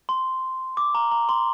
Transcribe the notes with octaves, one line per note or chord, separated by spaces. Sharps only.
C6
D6
A#5
A#5
C6